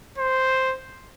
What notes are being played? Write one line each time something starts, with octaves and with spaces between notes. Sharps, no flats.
C5